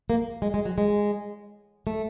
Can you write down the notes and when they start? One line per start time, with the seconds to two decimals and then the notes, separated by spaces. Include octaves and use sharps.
0.10 A#3
0.42 G#3
0.54 G#3
0.65 F#3
0.78 G#3
1.87 A3